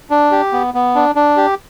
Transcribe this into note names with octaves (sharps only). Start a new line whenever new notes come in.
D4
G4
B3
B3
D4
D4
G4